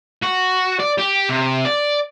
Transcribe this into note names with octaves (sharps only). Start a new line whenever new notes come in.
F#4
D5
G4
C3
D5